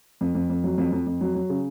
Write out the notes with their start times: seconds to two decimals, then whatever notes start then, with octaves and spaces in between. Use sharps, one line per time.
0.21 F2
0.35 F2
0.50 F2
0.64 F#3
0.78 F2
0.93 F2
1.07 F2
1.21 F#3
1.35 F#3
1.50 C#3